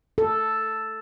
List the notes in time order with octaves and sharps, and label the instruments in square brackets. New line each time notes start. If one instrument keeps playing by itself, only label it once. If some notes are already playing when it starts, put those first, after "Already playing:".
[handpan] A4